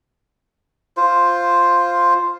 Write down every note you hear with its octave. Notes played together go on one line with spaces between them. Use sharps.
F4 C5